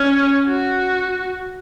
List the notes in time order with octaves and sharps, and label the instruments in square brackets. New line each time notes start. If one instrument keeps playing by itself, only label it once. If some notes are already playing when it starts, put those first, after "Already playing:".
Already playing: [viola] C#4
F#4